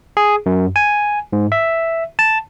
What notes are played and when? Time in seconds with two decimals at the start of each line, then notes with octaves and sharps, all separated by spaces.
0.17 G#4
0.46 F#2
0.76 G#5
1.33 G#2
1.52 E5
2.19 A5